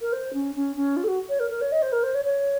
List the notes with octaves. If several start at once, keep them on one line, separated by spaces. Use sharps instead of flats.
A#4
C5
C#4
C#4
C#4
F4
A4
F#4
C#5
A#4
A#4
C#5
D#5
C5
A#4
C5
C#5
C#5